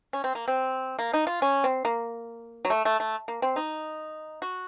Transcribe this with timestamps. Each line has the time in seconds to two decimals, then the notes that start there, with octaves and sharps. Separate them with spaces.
0.13 C#4
0.24 C4
0.35 A#3
0.48 C4
0.99 A#3
1.13 D#4
1.27 F4
1.42 C#4
1.64 C4
1.85 A#3
2.65 F#3
2.70 A3
2.85 A3
3.00 A3
3.28 A#3
3.42 C4
3.56 D#4
4.42 F#4